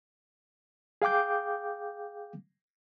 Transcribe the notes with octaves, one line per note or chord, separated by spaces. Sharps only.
G#4 F5 G5 D6 G6